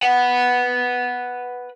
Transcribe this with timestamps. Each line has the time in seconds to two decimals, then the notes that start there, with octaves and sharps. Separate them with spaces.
0.02 B4 F#5